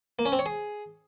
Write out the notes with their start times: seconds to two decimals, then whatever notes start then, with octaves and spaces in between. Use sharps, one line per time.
0.19 A#3
0.26 C#4
0.32 C4
0.39 C#5
0.46 G#4